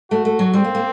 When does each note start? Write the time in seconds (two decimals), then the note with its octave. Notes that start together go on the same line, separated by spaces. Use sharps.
0.11 A3 F#4
0.25 A3
0.39 F#3
0.53 G3 C4
0.64 A#3
0.75 A#3